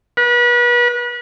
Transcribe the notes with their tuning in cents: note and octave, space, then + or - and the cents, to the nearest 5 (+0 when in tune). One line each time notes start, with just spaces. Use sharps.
B4 -35